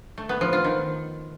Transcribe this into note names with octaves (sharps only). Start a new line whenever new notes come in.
A3
B3
F3
F4
D#3